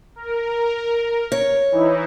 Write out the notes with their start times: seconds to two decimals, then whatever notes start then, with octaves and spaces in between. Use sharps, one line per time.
0.16 A#4
1.32 C#5
1.72 E3 D#4 E4